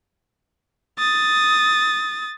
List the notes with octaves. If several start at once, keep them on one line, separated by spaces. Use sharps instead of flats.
D#6 A6